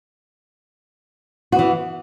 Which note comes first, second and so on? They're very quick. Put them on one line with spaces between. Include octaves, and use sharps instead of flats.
F#4 B3 E3